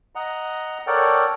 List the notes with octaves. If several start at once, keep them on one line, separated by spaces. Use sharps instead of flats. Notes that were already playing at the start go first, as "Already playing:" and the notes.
D#5 F#5 A#5
A4 A#4 C#5 D5 F#5 G5